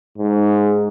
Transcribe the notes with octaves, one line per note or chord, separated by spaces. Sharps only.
G#2